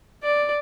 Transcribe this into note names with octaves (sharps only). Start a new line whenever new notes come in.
D5